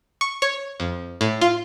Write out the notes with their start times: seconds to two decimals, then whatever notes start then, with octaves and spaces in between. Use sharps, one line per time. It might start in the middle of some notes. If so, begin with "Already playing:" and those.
0.21 C#6
0.42 C#5
0.80 F2
1.21 A2
1.41 F4